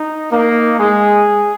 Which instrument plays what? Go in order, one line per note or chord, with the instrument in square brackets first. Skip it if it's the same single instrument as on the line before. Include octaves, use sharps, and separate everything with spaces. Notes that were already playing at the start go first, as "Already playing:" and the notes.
Already playing: [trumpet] D#4
[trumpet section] A#3 [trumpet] D#4
[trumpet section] G#3 [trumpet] G#4